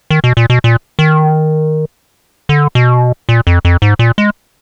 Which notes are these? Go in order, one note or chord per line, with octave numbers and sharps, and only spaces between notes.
D#3
B2
A#2
B2
A#2
D#3
D3
B2
A#2
F2
F2
G#2
A#2
G#3